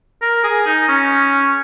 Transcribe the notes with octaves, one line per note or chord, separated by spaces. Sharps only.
A#4
G#4
D#4
C#4